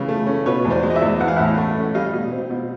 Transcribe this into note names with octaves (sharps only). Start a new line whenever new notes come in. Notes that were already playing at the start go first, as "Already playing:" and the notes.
Already playing: C#3 E3
A3
C#4
B2 B4 C#5
E2
C5 D5
G#3
D#5
D5 E5
E2
E3 F#5
F5
A2 E5 F#5
A3
C#4
G3 D#5 F5
B2
C4
B2